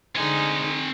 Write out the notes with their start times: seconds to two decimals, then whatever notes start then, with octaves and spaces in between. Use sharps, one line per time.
0.15 D3 G#3 C4 D#4 G#5